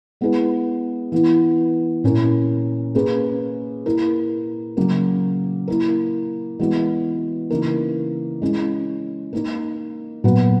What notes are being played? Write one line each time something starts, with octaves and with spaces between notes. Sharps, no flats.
G#3 B3 E4 G#4 B4
E3 B3 E4
A#2 A#3 C#4 E4 A#4
A#3 C#4 G#4 B4
A#3 E4 A#4
C#3 F#3 A#3
A#3 E4 A#4
E3 G#3 B3 F#4
C#3 E3 A#3 D#4 A#4
G#3 C#4 E4
A#3 D#4 A#4
A#2 F#3 B3 F#4 B4